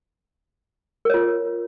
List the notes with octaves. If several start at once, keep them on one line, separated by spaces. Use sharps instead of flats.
F4 A#4 C#5